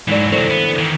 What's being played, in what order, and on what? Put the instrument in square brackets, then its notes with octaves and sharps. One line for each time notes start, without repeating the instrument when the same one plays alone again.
[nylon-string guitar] G#2 D5 [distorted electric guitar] E3 F#3
[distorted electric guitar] C2 F#3 [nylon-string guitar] D3 E3 C5
[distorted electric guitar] B3
D#3 E3